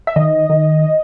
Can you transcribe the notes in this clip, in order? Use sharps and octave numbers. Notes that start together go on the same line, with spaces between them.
E5
D#3 D#5
D#3